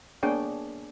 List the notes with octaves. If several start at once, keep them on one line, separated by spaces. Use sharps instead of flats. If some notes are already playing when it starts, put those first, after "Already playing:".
A#3 B3 D4 G#4 C#5 G5